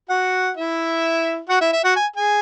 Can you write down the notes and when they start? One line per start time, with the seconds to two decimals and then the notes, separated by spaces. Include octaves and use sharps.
0.09 F#4 F#5
0.57 E4 E5
1.49 F#4 F#5
1.61 E4 E5
1.73 E5
1.84 F#4 F#5
1.96 G#5
2.16 G#4 G#5